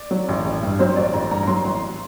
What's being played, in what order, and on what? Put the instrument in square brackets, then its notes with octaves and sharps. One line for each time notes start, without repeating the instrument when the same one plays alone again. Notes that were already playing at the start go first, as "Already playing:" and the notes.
Already playing: [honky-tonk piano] D5
F#3
A1
A1
G2
F#3 C5
A1 D5
A1 A#5
G2 A#5
A#5
F#3 C6
A1